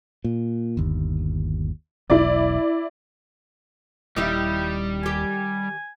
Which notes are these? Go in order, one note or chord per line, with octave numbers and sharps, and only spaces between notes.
A#2
G1 D#2
E1 B1 E4 D5
D#1 G3 D#4 E4 G4 F5
D#3 G4 G#5